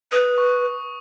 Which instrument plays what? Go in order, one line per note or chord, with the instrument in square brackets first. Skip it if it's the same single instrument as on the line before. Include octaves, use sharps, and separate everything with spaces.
[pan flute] B4 [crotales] D#6
[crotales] C#6